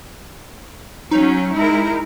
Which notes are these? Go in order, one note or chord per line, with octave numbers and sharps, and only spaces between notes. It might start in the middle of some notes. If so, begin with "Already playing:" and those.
F#3 C#4 D#4
G#3 E4 A#4